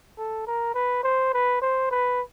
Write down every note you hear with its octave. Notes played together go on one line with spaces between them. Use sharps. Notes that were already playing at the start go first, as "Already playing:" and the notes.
A4
A#4
B4
C5
B4
C5
B4